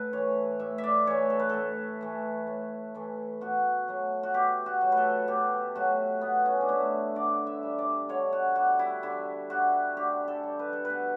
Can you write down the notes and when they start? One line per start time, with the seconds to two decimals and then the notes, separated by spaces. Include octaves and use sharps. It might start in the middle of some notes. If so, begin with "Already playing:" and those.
Already playing: A2 A4 B4
0.13 E3 A3 C#5
0.59 A2 E5
0.78 E5
0.84 D5
1.06 E3 A3 C#5
1.30 A4
1.40 B4
1.49 A2 A4
2.01 E3 A3
2.47 A2
2.95 E3 A3
3.41 B2 F#4
3.88 F#3 A3
4.23 F#4
4.34 B2 G4
4.66 F#4
4.81 F#3 A3
4.92 A4 B4
5.28 B2 G4
5.75 F#3 A3 F#4
6.21 B2 B3
6.46 C#4
6.61 D4
6.68 F#3 A3 E4
7.15 D3 D5
7.47 E5
7.63 G3
7.79 D5
8.09 D3 C#5
8.33 F#4
8.56 G3 F#4
8.79 E4
9.03 D3 E4
9.50 G3 F#4
9.96 D3 G4
10.28 A4
10.43 G3
10.59 B4
10.73 A4
10.85 B4
10.90 B2